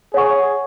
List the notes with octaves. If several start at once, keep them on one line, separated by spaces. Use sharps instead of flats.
G#4 C#5 F#5 C#6